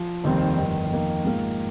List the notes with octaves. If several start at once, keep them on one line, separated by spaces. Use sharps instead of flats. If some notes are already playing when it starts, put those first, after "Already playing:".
Already playing: F3
F1 D#2 D#3 G3 C4
G1 F2 D#3
F2 D#3 A#3
G#2 F3 A#3